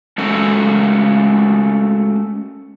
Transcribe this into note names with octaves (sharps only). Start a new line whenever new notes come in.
G#3 A3 C#4 F#4 A4 A#4